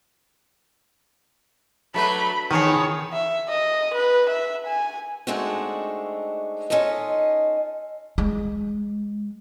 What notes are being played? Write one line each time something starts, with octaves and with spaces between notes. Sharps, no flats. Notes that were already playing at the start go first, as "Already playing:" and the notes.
F#3 A3 D4 B4 B5
E2 D#3 B3 G#4 C#5 A5 D#6
E5
D#5
B4
E5
G#5
G#3 A3 C4 D4 D#4 F#4
C#4 D#4 F4 A4 D#5
G#3